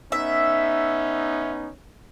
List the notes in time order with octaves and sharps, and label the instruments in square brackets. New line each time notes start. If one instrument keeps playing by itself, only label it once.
[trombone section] B3 C#4 D#4 [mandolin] E5